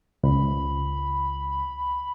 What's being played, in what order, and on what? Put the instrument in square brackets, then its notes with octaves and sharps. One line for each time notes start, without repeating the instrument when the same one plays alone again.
[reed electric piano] C#2 [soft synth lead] B5